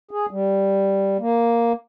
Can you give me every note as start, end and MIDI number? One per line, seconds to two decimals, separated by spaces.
0.11 0.26 68
0.31 1.17 55
1.20 1.73 58